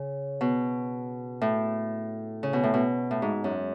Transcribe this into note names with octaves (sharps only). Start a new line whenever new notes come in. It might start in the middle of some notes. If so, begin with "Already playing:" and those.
Already playing: C#3
B2
A2
C#3
B2
A2
B2
A2
G#2
F#2